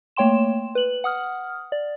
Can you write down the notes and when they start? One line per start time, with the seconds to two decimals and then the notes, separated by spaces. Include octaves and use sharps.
0.17 A3 A#3 C#5 G5 C6 E7
0.75 B4 F#7
1.04 F#5 D#6 F6
1.72 D5